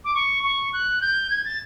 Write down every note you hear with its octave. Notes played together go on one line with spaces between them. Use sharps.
D6
C#6
C#6
F#6
G6
G#6
A6